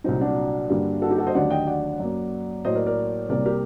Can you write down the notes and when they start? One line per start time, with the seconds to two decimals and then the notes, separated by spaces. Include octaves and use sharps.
0.04 C2 A#2 F#3 C4 D#4
0.21 D4 F#4
0.69 G2 D3 G3 A#3
1.02 F#4 A4
1.10 D#4 G4
1.18 F#4 A4
1.27 C5 D#5
1.35 D#2 D3 F#3 A3 D5 F#5
1.51 D#5 G5
1.67 D5 F#5
2.00 F#2 F#3 A#3
2.65 A2 F#3 A#3 C5 D#5
2.75 A#4 D5
2.86 A#4 D5
3.29 C2 C3 G3 A#3 A#4 D5
3.45 G4 A#4